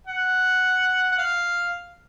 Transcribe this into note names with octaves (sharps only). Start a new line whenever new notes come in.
F#5
F#5
F5